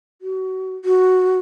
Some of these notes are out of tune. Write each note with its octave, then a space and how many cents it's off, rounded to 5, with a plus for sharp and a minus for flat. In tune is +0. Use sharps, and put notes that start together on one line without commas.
F#4 +30
F#4 +0